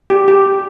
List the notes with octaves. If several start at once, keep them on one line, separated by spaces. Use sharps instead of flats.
G4
G4